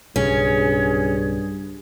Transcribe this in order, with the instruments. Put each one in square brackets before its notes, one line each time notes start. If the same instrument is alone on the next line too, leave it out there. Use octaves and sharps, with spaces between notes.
[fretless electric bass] B1 C#3 [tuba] G2 [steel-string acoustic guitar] C#4 [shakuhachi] G#4